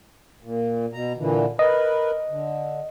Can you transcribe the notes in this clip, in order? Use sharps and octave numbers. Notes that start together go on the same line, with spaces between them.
A#2
B2 A#5
A#2 D3 E3
A#4 B4 D#5
D3